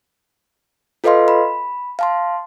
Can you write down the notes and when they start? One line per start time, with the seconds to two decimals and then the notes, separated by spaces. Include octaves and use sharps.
1.04 F4 A4 B4 D#5 F5 C6
1.28 B5
1.99 F5 A5 C6